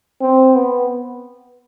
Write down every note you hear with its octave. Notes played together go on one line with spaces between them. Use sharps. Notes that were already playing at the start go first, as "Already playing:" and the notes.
C4
B3